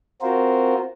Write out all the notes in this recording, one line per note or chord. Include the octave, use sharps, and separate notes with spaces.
C4 F4 F#4 A#4 C5